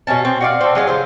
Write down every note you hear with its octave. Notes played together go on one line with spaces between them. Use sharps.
B2 G#3 C#4 A5
C4
F#4 D5 F5
A3 C4
F#3 G#4 D5 F5
C#3 F4 C5